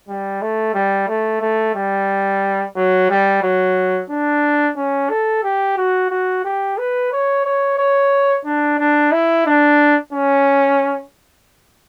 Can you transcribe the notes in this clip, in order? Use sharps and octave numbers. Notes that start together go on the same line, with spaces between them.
G3
A3
G3
A3
A3
G3
F#3
G3
F#3
D4
C#4
A4
G4
F#4
F#4
G4
B4
C#5
C#5
C#5
D4
D4
E4
D4
C#4